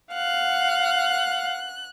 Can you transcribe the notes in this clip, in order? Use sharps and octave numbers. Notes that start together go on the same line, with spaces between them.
F5 F#5 F#6